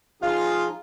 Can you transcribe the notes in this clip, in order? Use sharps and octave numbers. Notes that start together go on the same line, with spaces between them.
F3 D#4 F4 G#4 F5